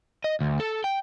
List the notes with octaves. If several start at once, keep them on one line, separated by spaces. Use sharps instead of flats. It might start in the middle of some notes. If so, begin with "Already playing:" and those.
D#5
D2
A4
G5